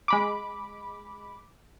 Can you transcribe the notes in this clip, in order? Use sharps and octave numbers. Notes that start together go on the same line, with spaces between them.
G#3 B5 D6